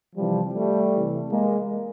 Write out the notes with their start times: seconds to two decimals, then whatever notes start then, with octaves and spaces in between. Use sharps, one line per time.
0.16 C3 E3 F3 G3
0.53 G3 A3
0.91 C3 E3
1.30 G#3 A#3